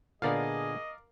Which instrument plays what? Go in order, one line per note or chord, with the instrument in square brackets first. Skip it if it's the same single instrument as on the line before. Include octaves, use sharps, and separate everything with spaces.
[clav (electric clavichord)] A#2 D3 B3 [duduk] G#4 [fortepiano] A#4 D5 F5 [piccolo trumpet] D#5